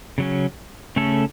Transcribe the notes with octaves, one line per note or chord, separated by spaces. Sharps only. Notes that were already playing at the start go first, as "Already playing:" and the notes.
C#3 F#3 C#4
C#3 A3 C#4 A4